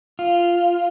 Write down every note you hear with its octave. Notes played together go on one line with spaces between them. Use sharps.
F4